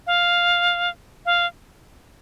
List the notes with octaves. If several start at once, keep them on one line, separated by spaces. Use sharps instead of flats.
F5
F5